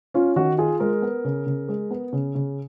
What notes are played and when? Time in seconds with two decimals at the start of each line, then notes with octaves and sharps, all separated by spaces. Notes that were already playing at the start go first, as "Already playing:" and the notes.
0.14 C#4 F4
0.36 D#3 F#4
0.58 F4 G#4
0.80 G#3 A#4
1.02 B3
1.24 C#3
1.46 C#3
1.69 G#3
1.91 B3
2.13 C#3
2.35 C#3